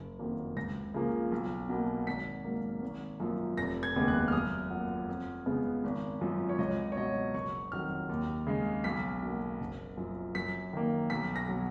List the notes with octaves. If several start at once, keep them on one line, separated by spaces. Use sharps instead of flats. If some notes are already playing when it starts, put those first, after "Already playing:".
Already playing: F#1
F2 D#3 F#3 A#3
C#2 A#6
C#3 F3 A#3
B1
B2 A#3
G#1 B6
G#2 F#3 A#3
G#1
F#2 F3 A#3
F1 A#6
G#6
D#2 C#3 G#3 B3
F#6
F6
F#2 D#6
F3 A#3 F#5
F2
C#3 G#3 B3
G#1
F#2 F3
C#5
C#2 D#5
C#5
B2 F#3 D#5
F#1 C#6
F2 D#3 F#3 F6
D#2
C#3 G#3
B1 B6
B2 A#3
F#1
F#2 F3
F#2 B6
D#3 A#3
B1 B6
A#6
B2 F#3